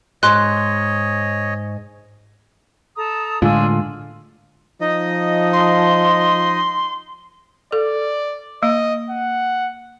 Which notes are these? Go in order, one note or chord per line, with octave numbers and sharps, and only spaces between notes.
G#2 C#5 D#5 C6 F#6
A4 A#5 D#6
A2 D3 G#3 D4 F4 G#5 E6
F3 D#4 D#5
C6
A4 D5
A#3 D#5
F#5